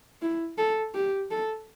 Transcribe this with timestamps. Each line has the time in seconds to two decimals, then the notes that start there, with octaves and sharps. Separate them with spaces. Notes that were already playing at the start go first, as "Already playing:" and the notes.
0.22 E4
0.58 A4
0.94 G4
1.31 A4